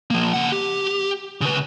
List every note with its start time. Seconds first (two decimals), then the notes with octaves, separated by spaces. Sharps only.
0.10 F3 A#3
0.34 C#3 F#5
0.52 G4
1.41 C#3 B4